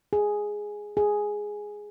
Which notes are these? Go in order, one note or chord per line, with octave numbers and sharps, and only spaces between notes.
G#4
G#4